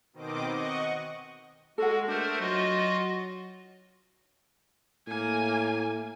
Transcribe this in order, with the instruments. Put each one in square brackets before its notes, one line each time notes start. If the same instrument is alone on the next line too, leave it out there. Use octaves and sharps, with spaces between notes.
[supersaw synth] B2 D#3 C4 D#5 D6
D#5 F#5 C#6
[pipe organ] G#3 F#4 [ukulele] A4 F#5
[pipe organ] A3 A#4 C5 [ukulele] D4
[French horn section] F#3 [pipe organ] F4 F#4 D#5
[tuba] A2 [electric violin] A#3 G#5